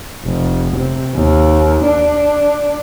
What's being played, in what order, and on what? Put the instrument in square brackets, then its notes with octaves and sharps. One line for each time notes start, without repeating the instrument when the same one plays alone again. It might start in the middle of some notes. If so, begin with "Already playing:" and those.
[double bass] F1
C3
D#2
D4